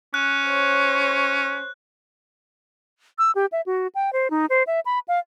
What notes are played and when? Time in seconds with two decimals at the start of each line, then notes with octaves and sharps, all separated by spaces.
0.14 C#4 F#6
0.47 C5 C#5
3.18 E6
3.35 G4
3.52 E5
3.66 F#4
3.95 G5
4.13 C5
4.30 D#4
4.50 C5
4.67 E5
4.86 B5
5.08 F5